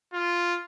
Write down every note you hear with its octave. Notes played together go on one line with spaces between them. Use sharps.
F4